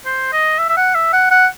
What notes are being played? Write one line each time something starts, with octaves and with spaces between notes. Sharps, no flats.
C5
D#5
E5
E5
F#5
E5
F#5
F#5